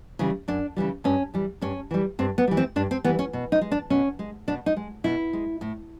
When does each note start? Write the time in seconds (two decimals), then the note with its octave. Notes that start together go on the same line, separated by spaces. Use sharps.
0.19 C#3 E3 G3
0.48 F#2 D4
0.76 C#3 E3 G3
1.04 G2 C#4
1.34 E3 G3
1.61 G2 C#4
1.91 E3 G3
2.19 G2 C4
2.38 B3
2.47 E3 G3
2.57 C4
2.76 G2 D4
2.91 C4
3.04 E3 G3 B3
3.19 C#4
3.33 B2
3.52 D#4
3.61 G#3
3.71 D4
3.90 B2 C#4
4.19 G#3
4.47 B2 D4
4.66 D#4
4.76 G#3
5.04 B2 E4
5.33 G#3
5.61 A2